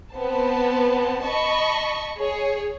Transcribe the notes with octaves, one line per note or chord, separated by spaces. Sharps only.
B3 C4 A5
D#5 A5 B5 C#6
G#4 C#5